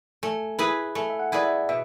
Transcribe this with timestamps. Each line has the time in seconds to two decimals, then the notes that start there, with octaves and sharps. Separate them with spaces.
0.23 A3 G#5
0.59 E4 G#4 B4
0.95 A3 G#5
1.10 E5
1.19 F#5
1.32 E4 G#4 B4 D5
1.45 E5
1.69 B2 E5